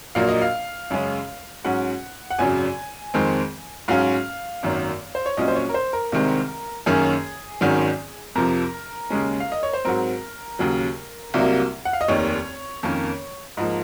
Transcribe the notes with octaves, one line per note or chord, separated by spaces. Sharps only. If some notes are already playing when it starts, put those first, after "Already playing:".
A#1 A#2 F#3 A#3 F5
D#5
F5
F#2 C#3 G#3 C#4
G#2 F#3 C#4 F#5
F#5
G#1 F#2 C#3 F#3 G#5
F2 D#3 G#3 C4
G#2 F#3 C#4 F5
G#1 F#2 D#3 F#3 A#3
C5
C#5
C2 A#2 F#3 C#4 D#5
C5
C#5
A#4
C5
A#4
C2 C3 D#3 G#3 C4
F#2 D#3 A#3 C#4 G#4
G#1 G#2 D#3 F#3 C#4
F2 C3 F3 A#4
D#2 C#3 G#3 C#4
F5
D#5
C#5
C5
G#2 F#3 C4 A#4
D#2 C#3 F#3
C2 C3 F#3 A#3
F#5
F5
D#5
F1 D#2 D#3 C#5
F2 D#3 A#3 C#4
G#2 F3 A#3 D#5